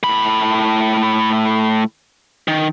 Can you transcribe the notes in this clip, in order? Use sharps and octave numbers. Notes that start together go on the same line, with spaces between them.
A2 B5
D#3